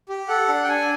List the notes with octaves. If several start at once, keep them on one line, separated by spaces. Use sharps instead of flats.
G4
A4 F#5
D4
G5
D4 G#5